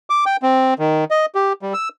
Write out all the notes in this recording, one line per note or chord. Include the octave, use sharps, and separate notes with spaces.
D6
G5
C4
D#3
D#5
G4
G3
E6